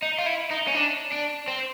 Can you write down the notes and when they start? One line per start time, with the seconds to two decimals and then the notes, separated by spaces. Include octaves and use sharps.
0.02 D#4
0.18 F4
0.26 E4
0.51 D#4
0.67 C#4
0.74 D4
1.12 D4
1.48 C4